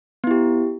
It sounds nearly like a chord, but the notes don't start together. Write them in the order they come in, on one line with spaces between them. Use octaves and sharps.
B3 E4 G4